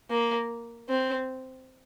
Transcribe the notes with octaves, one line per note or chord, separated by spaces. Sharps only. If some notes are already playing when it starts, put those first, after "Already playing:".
A#3
C4